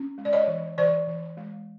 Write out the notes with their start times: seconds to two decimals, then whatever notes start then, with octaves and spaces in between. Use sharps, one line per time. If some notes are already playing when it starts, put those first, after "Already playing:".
Already playing: C#4
0.18 G#3
0.25 D5
0.33 C#5 D#5
0.48 E3
0.78 E3 C5 D5
1.07 E3
1.37 G#3